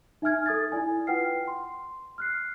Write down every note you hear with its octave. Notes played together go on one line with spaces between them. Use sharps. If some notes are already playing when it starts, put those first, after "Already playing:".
D#4 E5 G#5 F6 G#6
A4 D#6 G#6 A6
E4 D5 G#5
F4 B4 F#5 G5 F6 C7
C6
F6 F#6 C7